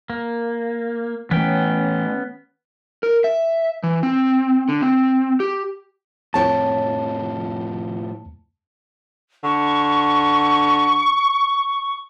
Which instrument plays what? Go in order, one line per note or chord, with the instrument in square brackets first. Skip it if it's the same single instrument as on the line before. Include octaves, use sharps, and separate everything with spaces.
[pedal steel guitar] A#3
[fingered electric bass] E3 A3 [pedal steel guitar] B3 C#4 G5
[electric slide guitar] A#4
E5
E3
C4
D3
C4
G4
[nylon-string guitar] F2 C#5 G5 [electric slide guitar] A2 F3 [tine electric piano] A5
[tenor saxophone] D3 [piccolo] C#6